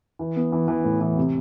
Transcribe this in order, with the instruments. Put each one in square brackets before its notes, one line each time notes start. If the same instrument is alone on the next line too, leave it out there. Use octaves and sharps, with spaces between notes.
[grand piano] E3
B3
E3
E3
A2
E3
C3